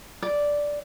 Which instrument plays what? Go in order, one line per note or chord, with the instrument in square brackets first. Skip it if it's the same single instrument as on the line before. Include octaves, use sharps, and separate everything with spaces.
[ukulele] D5